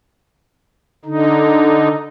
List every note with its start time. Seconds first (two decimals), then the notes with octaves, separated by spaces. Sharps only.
1.05 D3 D#4